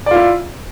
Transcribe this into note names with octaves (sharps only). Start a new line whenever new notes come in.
E4 F4 D5